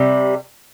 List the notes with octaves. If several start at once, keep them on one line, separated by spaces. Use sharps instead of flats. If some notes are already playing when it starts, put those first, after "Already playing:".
Already playing: C3 G3